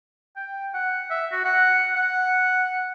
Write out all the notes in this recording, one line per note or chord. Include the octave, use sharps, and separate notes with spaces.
G5
F#5
E5
F#4
F#5
F#5